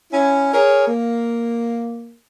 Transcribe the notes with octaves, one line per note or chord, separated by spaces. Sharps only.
C#4 E4
G#4 A#4 C#5
A#3